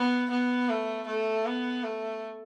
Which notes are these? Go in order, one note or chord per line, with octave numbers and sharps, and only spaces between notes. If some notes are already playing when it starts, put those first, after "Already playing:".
Already playing: B3
B3
A3
A3
B3
A3